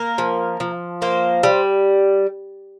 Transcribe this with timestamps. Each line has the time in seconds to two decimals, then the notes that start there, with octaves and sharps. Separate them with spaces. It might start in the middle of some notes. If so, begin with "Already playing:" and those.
Already playing: A#3 A#4
0.18 F3
0.60 F3
1.02 A#3 C5
1.43 G3